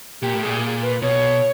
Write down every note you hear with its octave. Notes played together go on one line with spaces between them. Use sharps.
A#2 G4
A2
A#2 G#4
B4
B2 C#5